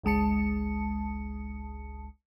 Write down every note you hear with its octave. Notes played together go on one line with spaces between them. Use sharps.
G1 C#2 G#3 A5 C#7